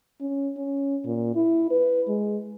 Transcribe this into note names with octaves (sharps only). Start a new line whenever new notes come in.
C#4
C#4
A#2
E4
B4
G#3